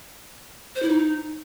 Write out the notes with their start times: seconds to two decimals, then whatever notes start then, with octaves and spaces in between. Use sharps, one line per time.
0.75 C5
0.82 E4
0.89 D#4